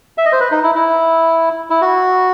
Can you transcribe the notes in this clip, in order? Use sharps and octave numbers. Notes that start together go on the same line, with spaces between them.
E5
D#5
C5
B4
D#4
E4
E4
E4
F#4